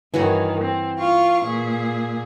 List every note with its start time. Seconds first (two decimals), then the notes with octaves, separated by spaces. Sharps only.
0.14 G2 D#3 E3 F#4 C#5
0.63 C4
0.98 F4 F5 C#6
1.45 A#2 G#4